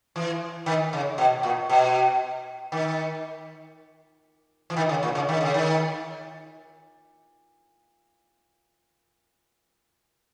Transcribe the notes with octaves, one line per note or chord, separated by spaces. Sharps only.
E3
D#3
C#3
B2
A#2
B2
D#3
E3
D#3
C#3
A#2
C#3
D#3
C#3
D#3